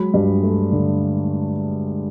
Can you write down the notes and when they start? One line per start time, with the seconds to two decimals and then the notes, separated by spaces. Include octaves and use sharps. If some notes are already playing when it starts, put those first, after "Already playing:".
Already playing: F#3 G#3 B5
0.14 G2
0.43 A3
0.72 D3